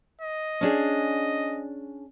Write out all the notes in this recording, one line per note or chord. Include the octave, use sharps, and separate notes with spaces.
D#5
C#4 D4 G#4